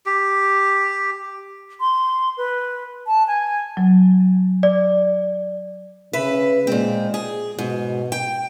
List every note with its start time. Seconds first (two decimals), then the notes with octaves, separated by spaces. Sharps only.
0.06 G4
1.80 C6
2.37 B4
3.07 A5
3.28 G#5
3.77 F#3
4.63 D5
6.13 C#3 B4 E5
6.67 A#2 G#3 C4
7.14 G#4
7.59 G#2 B2
8.12 G5